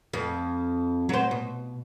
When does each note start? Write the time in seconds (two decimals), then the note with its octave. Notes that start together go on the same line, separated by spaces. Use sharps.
0.13 F2
1.09 F#3 C5
1.31 B2